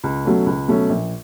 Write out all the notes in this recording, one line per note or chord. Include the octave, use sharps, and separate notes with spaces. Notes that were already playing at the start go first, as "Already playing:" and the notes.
C#2
B2 F#3 A3 C#4
C#2
B2 F#3 A3 C#4
A#1